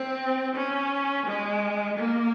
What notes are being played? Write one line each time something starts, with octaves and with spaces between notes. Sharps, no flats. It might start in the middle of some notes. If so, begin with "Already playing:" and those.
Already playing: C4
C#4
G#3
A#3